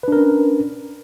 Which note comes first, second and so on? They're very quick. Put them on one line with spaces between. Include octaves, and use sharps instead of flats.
B4 D4 A#4 C#4